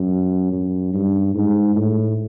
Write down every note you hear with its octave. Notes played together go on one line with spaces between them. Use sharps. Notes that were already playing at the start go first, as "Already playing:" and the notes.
Already playing: F#2
F#2
G2
G#2
A2